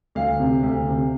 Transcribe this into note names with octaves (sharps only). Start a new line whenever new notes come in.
D2 F5
C3
D2
C3